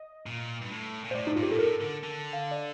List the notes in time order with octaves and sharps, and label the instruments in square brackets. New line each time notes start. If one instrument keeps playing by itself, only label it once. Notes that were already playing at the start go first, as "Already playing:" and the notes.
Already playing: [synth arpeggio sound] D#5
[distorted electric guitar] A#2
G2
A2
A#2
[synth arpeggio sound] C5
[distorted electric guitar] A2 [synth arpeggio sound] D5
[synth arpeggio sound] D#4
[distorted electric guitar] G2 [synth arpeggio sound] F4
[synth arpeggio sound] G4
[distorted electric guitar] A#2 [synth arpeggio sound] A4
[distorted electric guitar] A2 [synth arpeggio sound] A#4
[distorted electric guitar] D3
D3
[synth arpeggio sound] F5
D5